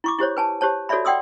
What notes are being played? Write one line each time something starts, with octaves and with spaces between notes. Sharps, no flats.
E4 C#6 D6
E4 G4 C5 C#5
B4 G#5 A5
G4 C5 C#5 A5
F#4 A4 C#5 D5 E5 B5
D5 F#5 G5 C6 D#6 E6